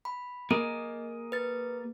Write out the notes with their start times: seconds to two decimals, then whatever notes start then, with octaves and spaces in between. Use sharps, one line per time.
0.05 B5
0.51 A#3 G#4 A#4 D#5
1.32 B4 A6